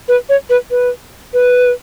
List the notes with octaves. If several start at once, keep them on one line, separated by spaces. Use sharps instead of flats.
B4
C#5
B4
B4
B4